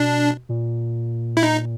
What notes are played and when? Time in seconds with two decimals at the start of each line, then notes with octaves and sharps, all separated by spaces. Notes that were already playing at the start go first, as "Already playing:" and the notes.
Already playing: B2 D4
0.49 A#2
1.37 E4
1.43 D#4